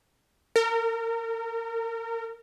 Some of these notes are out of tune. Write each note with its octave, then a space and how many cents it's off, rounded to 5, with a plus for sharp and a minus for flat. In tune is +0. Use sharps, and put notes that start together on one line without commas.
A#4 -30